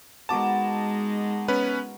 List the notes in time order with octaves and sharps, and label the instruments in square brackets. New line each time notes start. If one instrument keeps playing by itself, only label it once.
[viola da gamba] G#3 D#4 [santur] B3 F#4 A#4 [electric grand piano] A5 D6
[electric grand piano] B3 C#4 B4